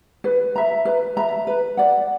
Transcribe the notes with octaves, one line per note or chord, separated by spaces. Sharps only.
B4
E5 A#5
B4
E5 A#5
B4
D5 F#5